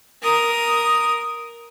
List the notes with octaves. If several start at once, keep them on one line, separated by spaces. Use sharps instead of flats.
A#4 D#6